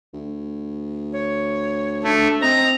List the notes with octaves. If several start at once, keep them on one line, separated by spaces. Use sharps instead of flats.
D2
C#5
A3 D4
C4 D#5 A#5